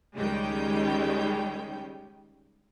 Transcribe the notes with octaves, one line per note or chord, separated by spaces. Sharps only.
C#2 D#3 G3 G#3 C#4 G5